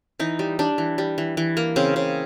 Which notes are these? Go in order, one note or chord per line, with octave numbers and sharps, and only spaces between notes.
E3 D#4
G3
G3 D4
E3
G3
E3
E3
A#3
C#3 C4
C#3